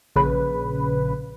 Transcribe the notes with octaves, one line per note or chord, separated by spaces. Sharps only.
A#1 C#3 B4